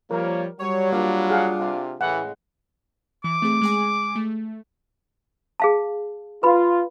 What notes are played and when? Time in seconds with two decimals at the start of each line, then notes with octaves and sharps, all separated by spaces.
0.11 F3 G3 A#3 A#4 C#5
0.60 F#3 G3 C#5
0.92 A#3 D4 F4
1.30 G#4 F5 F#5
1.60 C3
2.01 A2 C#3 E3 G#3 F#5
3.24 E3 D6
3.42 A3 C4 G#4
3.61 G#3 G#4 G#5
4.16 A3
5.60 G#4 F5 A5
6.43 F4 B4 B5